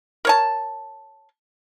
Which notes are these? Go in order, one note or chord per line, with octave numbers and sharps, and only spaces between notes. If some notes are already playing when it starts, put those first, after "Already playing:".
A#4 C#5 A5